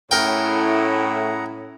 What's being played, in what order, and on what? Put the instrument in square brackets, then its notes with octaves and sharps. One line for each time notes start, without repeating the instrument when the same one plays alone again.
[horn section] A2 [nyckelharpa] C#4 E4 [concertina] G#4 F#5 A#5 [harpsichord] A#4 G5